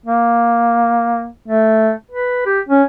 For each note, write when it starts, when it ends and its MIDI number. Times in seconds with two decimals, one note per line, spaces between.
0.06 1.28 58
1.48 1.92 57
2.11 2.42 71
2.46 2.60 67
2.69 2.84 61